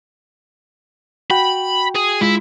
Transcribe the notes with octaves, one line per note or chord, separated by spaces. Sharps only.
F#4 G5 B5
G#4
G#3 E4 F4